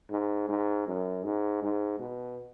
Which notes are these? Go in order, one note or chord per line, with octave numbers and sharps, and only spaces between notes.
G#2
G#2
F#2
G#2
G#2
B2